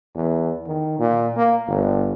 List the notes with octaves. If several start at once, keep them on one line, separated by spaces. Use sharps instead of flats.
E2
D#3
A#2
A#3
G1